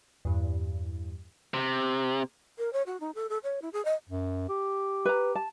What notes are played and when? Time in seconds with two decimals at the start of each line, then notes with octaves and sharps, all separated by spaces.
0.25 E2 G2
1.54 C3
2.58 A#4
2.73 C#5
2.86 F#4
3.00 D#4
3.15 A4
3.30 A4
3.44 C#5
3.62 E4
3.73 G#4
3.85 D#5
4.09 F#2
4.49 G4
5.05 B4 A#5
5.35 A5